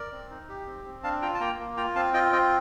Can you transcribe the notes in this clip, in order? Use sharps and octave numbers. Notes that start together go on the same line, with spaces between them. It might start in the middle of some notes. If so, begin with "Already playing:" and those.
Already playing: A#4 D5
C4
D#4
G4
C4
C4
D4 F5 A5
F4 G5 A#5
A5
A#3 G5 A#5
A#3
F4 G5 A#5
C4 F5 A5
F4 D#5 G5
C4 D#5 G5